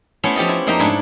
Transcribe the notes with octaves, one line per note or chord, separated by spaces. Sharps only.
A3 B3 C#4 E4 C5
F3 G4 A4 D#5
E4
F2 A#3 D#4 E5 G5 A#5
G#2 A3 D4 E4